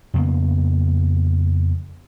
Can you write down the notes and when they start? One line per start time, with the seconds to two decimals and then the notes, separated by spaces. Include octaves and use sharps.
0.14 F2 C#3 A#3 B3